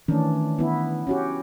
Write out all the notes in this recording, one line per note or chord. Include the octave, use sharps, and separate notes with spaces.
D#3 E3 A3 C#4 D4
B3 E4
C#4 F#4 G4